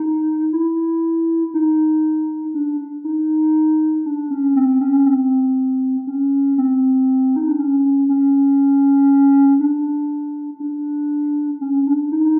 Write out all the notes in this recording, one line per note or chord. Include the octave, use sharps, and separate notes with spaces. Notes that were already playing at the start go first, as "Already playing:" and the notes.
Already playing: D#4
E4
D#4
D4
D#4
D4
C#4
C4
C#4
C4
C#4
C4
D#4
D4
C#4
C#4
D4
D4
C#4
D4
D#4